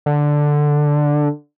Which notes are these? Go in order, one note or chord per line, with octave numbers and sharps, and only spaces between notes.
D3